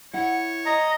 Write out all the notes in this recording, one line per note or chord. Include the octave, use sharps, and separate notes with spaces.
E4 C#5 F#5
D#5 A#5